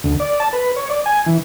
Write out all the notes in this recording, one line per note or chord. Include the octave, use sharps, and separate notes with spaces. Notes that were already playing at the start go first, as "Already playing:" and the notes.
D2
D5
A5
B4
C#5
D5
G#5
E3